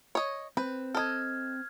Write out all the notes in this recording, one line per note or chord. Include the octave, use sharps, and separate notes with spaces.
C#5 D#5
C4 B4
A4 D#5 F6 G#6